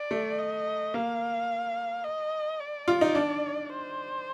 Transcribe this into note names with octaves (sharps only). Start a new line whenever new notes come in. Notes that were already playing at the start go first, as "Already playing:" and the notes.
Already playing: D5
A3
D#5
A#3 F5
D#5
D5
F4
D#4
D4
C5